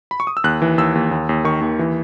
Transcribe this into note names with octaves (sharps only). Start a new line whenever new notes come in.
B5
C#6
D#6
E6
D#2 F#6
E3
D#2 E6
D#2
D#2
D#2
D#3 C#6
D#2
E3